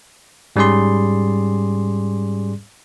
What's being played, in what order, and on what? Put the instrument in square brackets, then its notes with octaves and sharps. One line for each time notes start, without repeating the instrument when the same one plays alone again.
[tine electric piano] G#2 G3 C#4 G#4 D5 C6